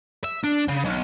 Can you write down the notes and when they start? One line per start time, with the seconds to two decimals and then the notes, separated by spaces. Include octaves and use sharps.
0.24 E5
0.44 D4
0.69 C#3
0.85 B1